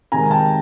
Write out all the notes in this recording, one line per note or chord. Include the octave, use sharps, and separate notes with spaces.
C3 D#3 G#3 G#5 A#5
G5 A5